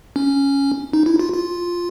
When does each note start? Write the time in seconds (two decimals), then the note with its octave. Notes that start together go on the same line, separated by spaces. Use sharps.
0.16 C#4
0.93 D#4
1.06 E4
1.19 F4
1.34 F4